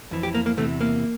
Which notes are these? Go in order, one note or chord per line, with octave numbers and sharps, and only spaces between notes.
F2 E3
G4
A#3
A#3
E2 C3 E3 A3
A#3